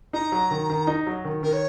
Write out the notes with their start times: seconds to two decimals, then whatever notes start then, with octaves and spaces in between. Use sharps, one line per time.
0.13 D#4 A#5
0.32 F#3
0.51 D#3
0.70 D#3
0.87 D#4
1.07 F#3
1.25 D#3
1.43 D#3 A#4
1.53 C#5